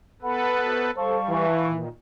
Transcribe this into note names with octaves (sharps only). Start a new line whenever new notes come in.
B3 A4 B4 F#5 B5
F#4 C5 E5
G3 A4 C5 F5 A5 C#6
E3
A#2 D#3